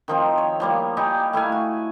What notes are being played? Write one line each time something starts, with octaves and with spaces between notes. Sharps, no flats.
D#3 F3 C4
C#5
F3 G3 A#3
G3 D#4 G4 G#5
A3 E4 F5 G#5
F#4